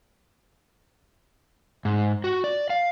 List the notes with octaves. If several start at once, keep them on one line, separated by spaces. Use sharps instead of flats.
G#2
F#4
D5
F5